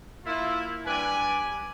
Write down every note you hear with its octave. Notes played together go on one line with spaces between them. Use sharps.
A#3 E4 F4
G2 G3 B4 D5 G#5